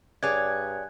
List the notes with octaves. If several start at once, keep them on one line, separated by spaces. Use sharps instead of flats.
G2 G#4 C#5 D5 G#5 F#6 G#6